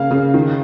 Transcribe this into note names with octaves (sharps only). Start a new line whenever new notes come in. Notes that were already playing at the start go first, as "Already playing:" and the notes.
Already playing: C#3 A#3 F5
C#3
D#3